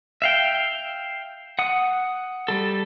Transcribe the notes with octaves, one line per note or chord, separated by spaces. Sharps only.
E5 F5 G5
F#5 D#6
G3 A4